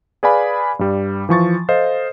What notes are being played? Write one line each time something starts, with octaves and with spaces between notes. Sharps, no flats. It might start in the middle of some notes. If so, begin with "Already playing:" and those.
G#4 B4 D5 F5 G#5 B5
G2 G3
E3 F3 C#6 A6
A4 C5 D#5 F5